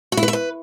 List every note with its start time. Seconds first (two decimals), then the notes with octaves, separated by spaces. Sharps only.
0.12 F#4
0.17 E4
0.23 B4
0.28 E5
0.33 B4